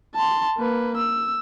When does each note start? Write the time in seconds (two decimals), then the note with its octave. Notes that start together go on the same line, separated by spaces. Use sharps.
0.15 A5 C6
0.58 A#3 B4
0.97 E6